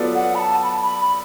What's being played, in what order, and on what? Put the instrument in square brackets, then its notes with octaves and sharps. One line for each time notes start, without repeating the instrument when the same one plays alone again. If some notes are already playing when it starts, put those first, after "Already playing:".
Already playing: [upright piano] F#3 B3 F4 A4 D5
[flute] F#5
B5
A5
B5
B5
B5